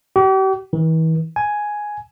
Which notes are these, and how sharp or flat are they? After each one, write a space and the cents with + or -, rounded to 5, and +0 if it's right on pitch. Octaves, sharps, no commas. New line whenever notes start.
G4 -40
E3 -40
G#5 +5